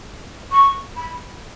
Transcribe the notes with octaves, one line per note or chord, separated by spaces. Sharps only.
C#6
B5